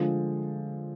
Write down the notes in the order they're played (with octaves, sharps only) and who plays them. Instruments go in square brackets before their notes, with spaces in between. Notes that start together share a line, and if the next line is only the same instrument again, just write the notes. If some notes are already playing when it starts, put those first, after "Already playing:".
Already playing: [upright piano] D3 F3 G#3